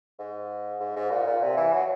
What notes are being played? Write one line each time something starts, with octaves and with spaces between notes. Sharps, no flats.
G#2
G#2
G#2
A#2
A#2
C3
E3
F#3